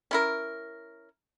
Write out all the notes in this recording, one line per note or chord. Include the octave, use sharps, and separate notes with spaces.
C#4 E4 A#4